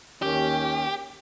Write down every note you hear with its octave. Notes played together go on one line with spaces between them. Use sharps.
D#2 D#3 C#4 G4